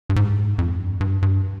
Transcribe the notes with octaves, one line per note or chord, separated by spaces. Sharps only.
G2
G#2
F2
G2
G2
G2